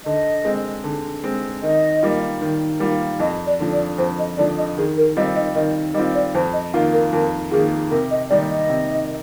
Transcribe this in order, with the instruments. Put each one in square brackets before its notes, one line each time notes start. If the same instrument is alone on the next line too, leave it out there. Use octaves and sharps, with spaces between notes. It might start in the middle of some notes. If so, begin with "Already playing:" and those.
[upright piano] D3 [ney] D#5
[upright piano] G#3 C4
D3
G#3 C4
[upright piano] D#3 [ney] D#5
[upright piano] G3 A#3 F4
D#3
G3 A#3 F4
[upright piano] F2 [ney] D#5
[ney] D5
[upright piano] D3 F3
[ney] D5
[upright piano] F2 [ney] C5
[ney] D#5
[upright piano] D3 F3 [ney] D5
[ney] D#5
[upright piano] D#3 [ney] G#4
[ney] A#4
[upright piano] G3 C4 F4 [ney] D#5
[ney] D#5
[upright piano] D#3 [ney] D#5
[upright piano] G3 [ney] D#5
[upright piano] C4 F4
[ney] D5
[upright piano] F2 [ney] C5
[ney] D#5
[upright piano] D#3 A#3 F4 [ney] F5
[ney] A#4
[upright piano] F2 [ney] A#4
[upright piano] D#3 A#3 F4 [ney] G#4
[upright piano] C3 [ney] A#4
[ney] D#5
[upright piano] D#3 G3 A#3 D#4 [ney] D5
[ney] D#5
[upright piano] C3